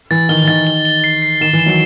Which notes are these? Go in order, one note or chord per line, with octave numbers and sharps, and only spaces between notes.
E3 A6
D#3 G7
E3
D#3 A6
G7
G7
C7
C7
D#3 E7
E3
E7
D#3 F#3